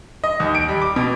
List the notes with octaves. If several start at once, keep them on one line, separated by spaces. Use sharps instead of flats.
D#5
D#2
D7
G3
D6
B2